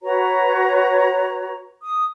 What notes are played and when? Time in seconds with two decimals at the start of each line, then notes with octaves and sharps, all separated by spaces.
0.03 F#4 B4 C#5 A#5
1.83 D#6